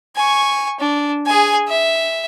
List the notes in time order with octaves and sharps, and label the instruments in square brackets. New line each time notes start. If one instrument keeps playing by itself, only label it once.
[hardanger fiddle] G#5 C#6
D4
G#4 G#5
E5